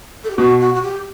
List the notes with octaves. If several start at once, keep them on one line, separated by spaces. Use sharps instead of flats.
A4
G4
B2 F#4
F#4
F#4
G4